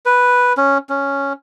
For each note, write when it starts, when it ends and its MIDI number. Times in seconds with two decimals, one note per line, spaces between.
0.06 0.53 71
0.57 0.78 61
0.89 1.33 61